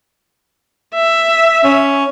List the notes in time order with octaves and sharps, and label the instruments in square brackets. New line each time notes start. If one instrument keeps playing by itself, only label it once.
[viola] E5
[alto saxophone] C#4